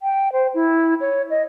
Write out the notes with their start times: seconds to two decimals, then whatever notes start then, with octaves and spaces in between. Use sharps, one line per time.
0.01 G5
0.32 C5
0.54 E4
1.01 C#5
1.30 D#5